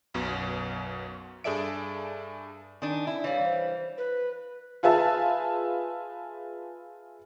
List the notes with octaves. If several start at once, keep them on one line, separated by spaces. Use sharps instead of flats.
B1 F#2 B2
G2 G#4 A4 D5 E5 D7
D#3 D4 G#5
E4
E3 G3 C#5 D5 F5
C5
B4
F4 G#4 B4 E5 A5